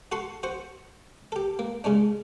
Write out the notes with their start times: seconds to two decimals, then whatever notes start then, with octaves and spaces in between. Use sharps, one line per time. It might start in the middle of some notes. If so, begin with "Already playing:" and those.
0.12 F#4 A4 C6 C#6
0.43 F#4 C5 C#6
1.32 G4 A4
1.59 A#3
1.84 C#3 G#3 C#4 D4